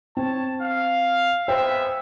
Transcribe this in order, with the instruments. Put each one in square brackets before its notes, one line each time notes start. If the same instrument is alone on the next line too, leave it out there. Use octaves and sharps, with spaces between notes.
[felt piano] C4 [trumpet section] C#5 A5
[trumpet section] F5
[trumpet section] G#3 B3 E5 [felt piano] C5 G5